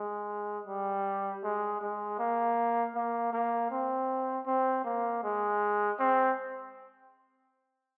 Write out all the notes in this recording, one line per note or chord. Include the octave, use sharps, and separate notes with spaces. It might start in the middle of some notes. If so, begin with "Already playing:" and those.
Already playing: G#3
G3
G#3
G#3
A#3
A#3
A#3
C4
C4
A#3
G#3
C4